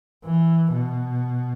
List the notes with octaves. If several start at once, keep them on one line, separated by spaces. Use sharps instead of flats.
E3
B2